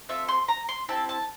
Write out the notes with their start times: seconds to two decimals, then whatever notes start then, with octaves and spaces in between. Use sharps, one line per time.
0.09 C4 F4 A4 E5
0.28 C6
0.48 A#5
0.69 C6
0.88 C4 E4 G4 A5
1.09 A5